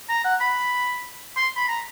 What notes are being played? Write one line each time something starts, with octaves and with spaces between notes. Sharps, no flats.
A#5
F#5
B5
C6
B5
A#5